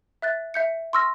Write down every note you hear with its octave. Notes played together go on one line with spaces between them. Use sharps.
E5 F#6 A6
E5 G6 C#7
C6 C#6 E6 F6 A#6